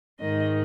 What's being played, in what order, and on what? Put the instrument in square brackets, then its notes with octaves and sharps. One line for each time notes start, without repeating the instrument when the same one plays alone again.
[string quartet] G#2 D#3 D#5